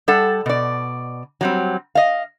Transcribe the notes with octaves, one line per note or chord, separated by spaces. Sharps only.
G3 A4 F#5
B2 D5
F#3 G3 C4
D#5 F5